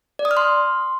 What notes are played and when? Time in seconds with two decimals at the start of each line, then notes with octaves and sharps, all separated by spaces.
0.19 D5
0.25 D#6
0.31 F6
0.37 C6